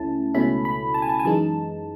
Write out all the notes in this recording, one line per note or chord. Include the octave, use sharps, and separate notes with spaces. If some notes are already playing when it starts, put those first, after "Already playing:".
Already playing: C#2 A3 C#4 E4 A5
C#2 B2 A3 C#4 E4 B5
B5
A5
G#5
A5
G#5
F#2 E3 G#3 D#4 A5